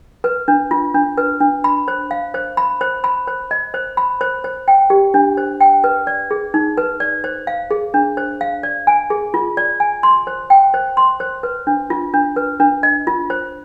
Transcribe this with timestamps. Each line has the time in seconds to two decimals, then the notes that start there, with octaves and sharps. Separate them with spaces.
0.24 B4
0.48 D4
0.71 F4
0.94 D4
1.18 B4
1.40 D4
1.64 B5
1.88 C5
2.11 F5
2.34 C5
2.57 B5
2.81 C5
3.04 B5
3.27 C5
3.51 D#5
3.74 C5
3.97 B5
4.21 C5
4.44 C5
4.68 G5
4.90 G4
5.14 D4
5.37 C5
5.60 G5
5.84 B4
6.07 D5
6.31 G#4
6.54 D#4
6.77 B4
7.00 D5
7.24 C5
7.47 F5
7.71 G#4
7.94 D4
8.17 C5
8.41 F5
8.63 D5
8.87 G#5
9.10 G#4
9.34 F4
9.57 D5
9.80 G#5
10.03 C6
10.27 C5
10.50 G5
10.74 C5
10.97 C6
11.20 C5
11.43 B4
11.67 D4
11.90 F4
12.14 D4
12.36 B4
12.60 D4
12.83 D#5
13.07 F4
13.30 C5